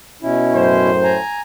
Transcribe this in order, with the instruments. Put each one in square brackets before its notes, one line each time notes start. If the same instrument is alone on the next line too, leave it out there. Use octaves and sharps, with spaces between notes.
[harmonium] B2 C#4 E4
[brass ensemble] F#2 A2 C5
[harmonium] G#5 A#5